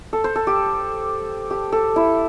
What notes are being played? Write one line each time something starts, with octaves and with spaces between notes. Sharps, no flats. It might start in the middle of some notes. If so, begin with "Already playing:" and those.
A4
C5
A4
G4
G4
A4
E4